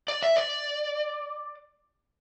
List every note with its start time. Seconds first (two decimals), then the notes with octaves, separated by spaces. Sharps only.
0.08 D5
0.23 E5
0.36 D5